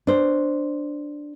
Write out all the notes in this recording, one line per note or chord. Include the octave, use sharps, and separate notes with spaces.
D4 C5